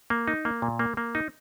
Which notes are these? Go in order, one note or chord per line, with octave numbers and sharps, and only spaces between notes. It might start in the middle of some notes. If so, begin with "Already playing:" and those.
A#3
D#4
A#3
A#2
A#3
A#3
D#4